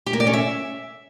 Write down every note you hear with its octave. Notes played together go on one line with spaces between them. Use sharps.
G4
A#3
D5
C#4
E5